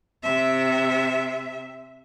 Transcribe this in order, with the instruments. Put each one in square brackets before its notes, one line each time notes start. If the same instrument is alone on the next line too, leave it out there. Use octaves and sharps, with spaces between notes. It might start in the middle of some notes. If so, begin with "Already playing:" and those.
[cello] C3 E5